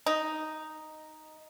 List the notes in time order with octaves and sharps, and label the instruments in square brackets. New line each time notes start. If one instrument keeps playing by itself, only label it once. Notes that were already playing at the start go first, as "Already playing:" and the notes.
[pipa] D#4